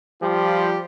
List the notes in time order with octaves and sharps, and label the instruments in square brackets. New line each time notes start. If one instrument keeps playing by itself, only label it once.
[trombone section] F3 G3 F4 G4